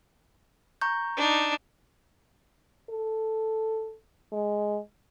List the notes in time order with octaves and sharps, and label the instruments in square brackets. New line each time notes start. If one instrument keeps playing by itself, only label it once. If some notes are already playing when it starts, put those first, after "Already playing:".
[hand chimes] A#5 C#6 G6
[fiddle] D4 D#4
[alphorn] A4
G#3